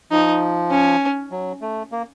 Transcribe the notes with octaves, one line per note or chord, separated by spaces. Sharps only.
F3 D#4
C#4
F#3
A3
A#3